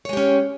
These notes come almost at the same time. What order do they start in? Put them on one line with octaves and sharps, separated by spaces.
C#5 G#3 G4 C#4